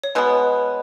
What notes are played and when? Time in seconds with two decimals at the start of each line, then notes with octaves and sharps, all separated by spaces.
0.03 C#5
0.15 B2 G#3 B3 B4